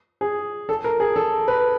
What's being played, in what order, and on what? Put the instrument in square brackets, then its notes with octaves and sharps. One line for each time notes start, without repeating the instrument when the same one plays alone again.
[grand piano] G#4
A4
A#4
G#4
A4
B4